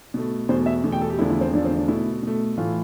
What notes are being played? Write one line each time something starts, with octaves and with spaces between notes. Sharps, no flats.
B2 A3
E2 B2 A3 C5
E5
E2 B2 A3
G5
A4
G4
E2 D3 F3 A3 E4
E4
C4
E2 D3 F3 A3 D4
C4
D4
B2 A3 E4
B2 A3
A2 E3 A3 F4